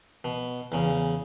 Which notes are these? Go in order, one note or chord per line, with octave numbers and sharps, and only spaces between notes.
B2
E2 C#3